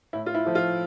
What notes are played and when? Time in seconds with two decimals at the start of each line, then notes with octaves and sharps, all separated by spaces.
0.13 A2 E4
0.26 F4
0.35 E4
0.45 F3 A3
0.55 F4